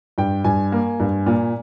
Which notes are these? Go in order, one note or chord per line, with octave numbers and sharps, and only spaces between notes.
G2 G5
G2 G#5
A#3
G2
A#2